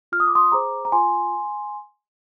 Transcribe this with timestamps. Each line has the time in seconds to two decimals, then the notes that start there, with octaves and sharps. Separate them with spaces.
0.12 F4 F6
0.20 D#6
0.28 D6
0.35 C6 D#6
0.52 G#4 C5 A#5 D6
0.85 A#5
0.92 F4 G#5 C6